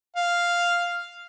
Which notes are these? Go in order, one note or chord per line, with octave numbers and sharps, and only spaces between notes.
F5